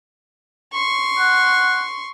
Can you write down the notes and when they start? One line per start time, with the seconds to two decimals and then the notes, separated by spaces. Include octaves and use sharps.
0.72 C6 C#6
1.19 F#5